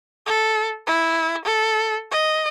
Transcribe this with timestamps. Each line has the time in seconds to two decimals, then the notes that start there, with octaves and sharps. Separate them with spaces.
0.26 A4
0.87 E4
1.45 A4
2.11 D#5